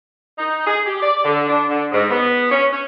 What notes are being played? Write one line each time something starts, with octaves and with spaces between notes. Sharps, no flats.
D#4
G#4
G4
D5
D3
D4
D3
G#2
B3
C#4
C#4